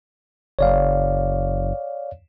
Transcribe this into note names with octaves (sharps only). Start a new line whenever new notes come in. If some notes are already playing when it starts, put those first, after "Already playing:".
F#1 C#5 D5 F5